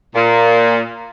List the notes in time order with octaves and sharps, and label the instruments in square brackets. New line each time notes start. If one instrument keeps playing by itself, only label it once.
[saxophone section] A#2